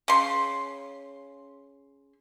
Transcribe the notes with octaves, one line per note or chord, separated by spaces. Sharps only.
C#3 C6